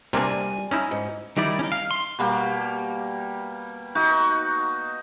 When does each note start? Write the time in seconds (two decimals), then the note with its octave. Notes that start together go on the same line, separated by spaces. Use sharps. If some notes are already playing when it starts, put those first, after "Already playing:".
0.13 C3 G3 A#3 D4 G#5
0.71 C#4 D#4 E4
0.91 G#2
1.37 D#3 G3 D#4 E4 D5
1.59 C#4 D#4
1.72 F5
1.91 C6
2.19 B2 G3 A#3
3.95 D#4 F#4